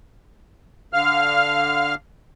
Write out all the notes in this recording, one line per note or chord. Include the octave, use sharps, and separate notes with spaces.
D3 F5 F6